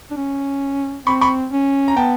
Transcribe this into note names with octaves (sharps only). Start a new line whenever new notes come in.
D4
C#4
C4 B5 C#6
B5 C#6
C#4
A#5
B3 G5 A5